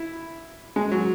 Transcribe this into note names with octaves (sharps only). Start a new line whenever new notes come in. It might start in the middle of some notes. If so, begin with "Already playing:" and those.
Already playing: E4
G#3
F#3